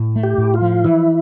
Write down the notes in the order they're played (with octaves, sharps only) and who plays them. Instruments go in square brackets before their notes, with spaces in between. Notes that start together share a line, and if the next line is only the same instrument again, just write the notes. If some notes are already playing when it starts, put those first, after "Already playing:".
Already playing: [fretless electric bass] A2
A3
[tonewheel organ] G4
[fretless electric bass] A2
[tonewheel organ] F4
[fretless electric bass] F3
[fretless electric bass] E3 [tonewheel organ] E4